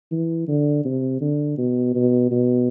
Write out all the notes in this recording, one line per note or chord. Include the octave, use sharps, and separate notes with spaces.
E3
D3
C3
D3
B2
B2
B2